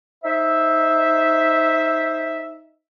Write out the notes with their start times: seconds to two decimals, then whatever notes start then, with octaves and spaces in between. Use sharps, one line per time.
0.24 D#4 C5 E5